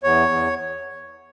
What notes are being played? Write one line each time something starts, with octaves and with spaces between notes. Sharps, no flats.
E2 C#5
E2